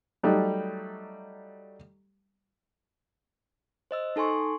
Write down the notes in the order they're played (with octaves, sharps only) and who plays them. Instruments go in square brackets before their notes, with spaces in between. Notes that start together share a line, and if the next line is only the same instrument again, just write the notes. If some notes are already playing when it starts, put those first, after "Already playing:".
[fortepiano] F#3 G3 A3 D#4
[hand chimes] C5 D#5 E6
D#4 A4 G#5 C6 C#6